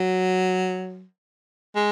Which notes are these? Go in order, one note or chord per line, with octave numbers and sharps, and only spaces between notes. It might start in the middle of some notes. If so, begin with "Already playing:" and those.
Already playing: F#3
G#3